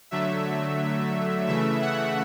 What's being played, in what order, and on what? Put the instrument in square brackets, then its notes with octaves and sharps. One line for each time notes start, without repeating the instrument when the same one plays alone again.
[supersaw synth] D3 F#3 A3 E5
C#3 E3 A3 E5
F#5